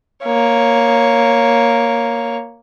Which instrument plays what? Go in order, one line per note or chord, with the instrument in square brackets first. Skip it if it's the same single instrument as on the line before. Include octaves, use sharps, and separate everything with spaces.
[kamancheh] A#3 C#5